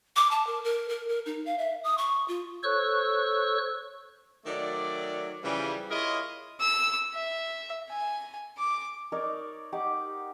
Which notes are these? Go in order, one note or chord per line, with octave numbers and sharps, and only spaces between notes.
D6
A5
A#4
A#4
A#4
A#4
D#4
F5
E5
D#6
C#6
F4
A4 C5 C#5 C#6 E6 F#6
D#3 F#3 A3 D5
C#3 E3 F3 G3
E4 F4 G#4 A#4 C#5 D#5
E6
E5
G#5
D6
D#4 A#4 C#5 D5
D#4 G4 F#5 D6